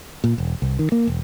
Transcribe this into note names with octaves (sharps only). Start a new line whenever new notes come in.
A#2
E1
C2
D#3
A#3
E1